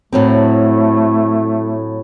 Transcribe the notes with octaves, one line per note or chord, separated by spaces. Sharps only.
A2 F#3 A3 C4